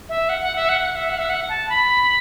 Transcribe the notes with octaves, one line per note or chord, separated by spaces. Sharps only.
E5
F#5
F#5
E5
F#5
F#5
E5
F#5
E5
F#5
A5
B5